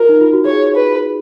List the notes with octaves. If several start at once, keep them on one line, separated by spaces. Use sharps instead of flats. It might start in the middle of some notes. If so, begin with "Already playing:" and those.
Already playing: F4 A#4
D#4
F4
F#4
G#4 C#5
B4